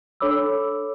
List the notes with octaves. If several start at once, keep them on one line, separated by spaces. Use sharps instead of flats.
D4 A4 C#5 B5 D6 E6